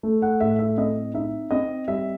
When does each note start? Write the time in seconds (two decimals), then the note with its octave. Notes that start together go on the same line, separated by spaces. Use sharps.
0.03 A3
0.22 F#5
0.40 A2 E5
0.59 E5
0.77 C4 D#5
1.14 D#4 E5
1.51 C4 D#5
1.88 G3 E5